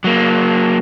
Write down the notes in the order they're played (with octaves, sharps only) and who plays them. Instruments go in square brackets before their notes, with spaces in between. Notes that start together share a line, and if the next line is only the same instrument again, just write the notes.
[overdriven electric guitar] F#3 A#3